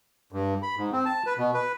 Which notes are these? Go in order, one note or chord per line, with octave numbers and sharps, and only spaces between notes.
G2
B5
G#2
C4
A5
B4
B2
B4